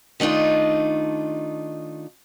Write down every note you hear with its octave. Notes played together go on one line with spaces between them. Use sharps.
D#3 A3 D4 D#4 F4